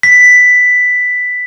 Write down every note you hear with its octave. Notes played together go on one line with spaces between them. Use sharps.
B6